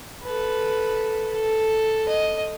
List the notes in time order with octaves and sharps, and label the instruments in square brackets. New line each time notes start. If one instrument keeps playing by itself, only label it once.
[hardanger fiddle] A4 B4
A4
D#5